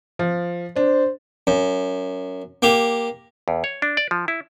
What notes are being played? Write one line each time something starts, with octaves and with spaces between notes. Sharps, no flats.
F3
D4 C5
F#2
A#3 G4
E2
C#5
D4
D5
F3
E4